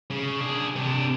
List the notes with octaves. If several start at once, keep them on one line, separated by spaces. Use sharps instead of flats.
C#3
D4 G#4
C3 D4